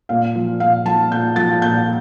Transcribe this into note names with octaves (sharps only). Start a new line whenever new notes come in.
A#2 F5
F3
A#2 F5
F3 A5
A#2 G6
F3 A6
A#2 G6